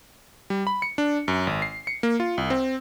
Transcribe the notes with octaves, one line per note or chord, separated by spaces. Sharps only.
G3
B5
C#7
D4
F#2
G#1
C7
C#7
A#3
F4
C2
C4